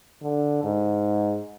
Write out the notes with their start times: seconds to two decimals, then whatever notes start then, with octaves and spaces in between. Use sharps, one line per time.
0.22 D3
0.64 G#2